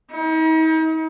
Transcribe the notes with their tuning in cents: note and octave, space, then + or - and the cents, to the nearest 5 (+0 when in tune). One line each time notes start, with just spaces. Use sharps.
D#4 +40